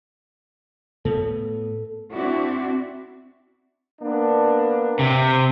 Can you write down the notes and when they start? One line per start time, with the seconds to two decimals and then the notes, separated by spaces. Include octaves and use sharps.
1.05 A2 B3 A4
2.13 C4 D4 E4 F#4
4.02 A#3 B3 D4
4.99 C3